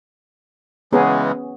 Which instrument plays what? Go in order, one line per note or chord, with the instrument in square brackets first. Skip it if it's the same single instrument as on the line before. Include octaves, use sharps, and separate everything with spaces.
[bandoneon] C#3 E3 G#3 [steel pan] B3 C#4 G#4